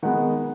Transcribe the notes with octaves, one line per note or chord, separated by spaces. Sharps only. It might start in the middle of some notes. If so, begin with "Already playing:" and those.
D#3 G#3 B3 F#5